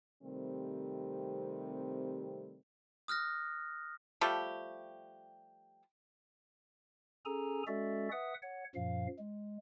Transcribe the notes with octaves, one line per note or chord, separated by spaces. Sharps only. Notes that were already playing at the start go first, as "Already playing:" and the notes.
C3 D#3 G3 A3 C4
D#6 F6 F#6 A#6
F3 G3 A3 G4
C#4 G#4 A4 G#5 A#5
G#3 C#4 F#4 A4 D5 E5
B4 E5 F#5 D#6
C#5 F#5
F#2 A#2 F3 F5
G#3